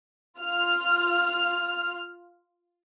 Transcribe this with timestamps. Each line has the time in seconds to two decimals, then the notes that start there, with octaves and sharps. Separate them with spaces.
0.40 F4 F6